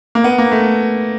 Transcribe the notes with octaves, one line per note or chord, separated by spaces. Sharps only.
A#3
B3
A#3
A3